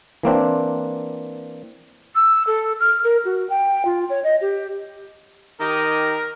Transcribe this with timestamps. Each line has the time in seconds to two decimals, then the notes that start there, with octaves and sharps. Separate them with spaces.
0.23 E3 A#3 C4 D4
2.15 E6
2.47 A4
2.80 F6
3.04 A#4
3.25 F#4
3.50 G5
3.85 F4
4.10 C#5
4.24 D#5
4.41 G4
5.60 D#3 G4 A#4 D#5